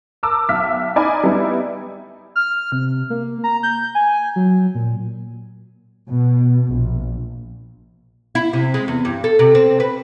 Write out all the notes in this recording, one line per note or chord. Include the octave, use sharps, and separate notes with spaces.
A#4 A5 A#5 D6 E6
B1 E5 F5 F6 B6
D#4 D5 D#5 G#5 B5 D6
G3 B3 D#4 E4
F6
C3
A#3
A#5
G6
G#5
F#3
A#2
B2
A#1
E4
C3
G#3
E2
G2
A4
C3
C4
B4